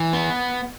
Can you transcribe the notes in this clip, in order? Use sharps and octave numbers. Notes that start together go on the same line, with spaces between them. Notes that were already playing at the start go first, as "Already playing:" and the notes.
Already playing: E3
B3